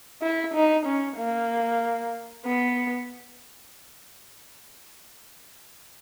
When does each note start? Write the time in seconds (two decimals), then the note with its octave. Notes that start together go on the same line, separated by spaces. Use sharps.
0.22 E4
0.54 D#4
0.86 C#4
1.18 A#3
2.45 B3